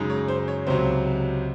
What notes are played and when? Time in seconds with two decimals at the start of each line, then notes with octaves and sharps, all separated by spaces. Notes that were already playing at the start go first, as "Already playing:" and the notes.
Already playing: F#2 C#3 G#3 D#4
0.10 C#5
0.28 C5
0.48 C#5
0.67 C#2 C3 F#3 C5